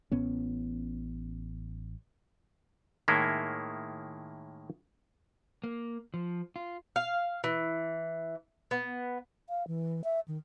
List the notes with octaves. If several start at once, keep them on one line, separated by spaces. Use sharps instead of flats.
A1 A2 B3 C#4
A2 D#3 G#3 A#3 E4
A#3
F3
F4
F5
E3
B3
F5
E3
E5
D#3